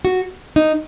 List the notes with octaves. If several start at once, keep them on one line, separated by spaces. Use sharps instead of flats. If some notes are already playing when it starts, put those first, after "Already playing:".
F#4
D#4